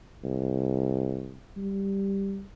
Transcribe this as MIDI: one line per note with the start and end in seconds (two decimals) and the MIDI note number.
0.24 1.38 36
1.57 2.44 55